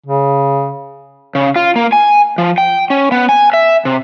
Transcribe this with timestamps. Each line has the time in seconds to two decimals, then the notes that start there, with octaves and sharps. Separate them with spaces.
0.06 C#3
1.35 C#3
1.56 F4
1.76 A#3
1.92 G#5
2.38 F3
2.58 G5
2.90 C#4
3.12 B3
3.29 G#5
3.53 E5
3.85 C3